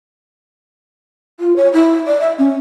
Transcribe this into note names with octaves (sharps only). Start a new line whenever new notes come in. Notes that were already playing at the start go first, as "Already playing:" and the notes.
F4
C#5
E4
D5
E5
C#4